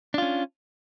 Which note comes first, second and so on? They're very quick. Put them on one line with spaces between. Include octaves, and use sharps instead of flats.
D4 F4 C#4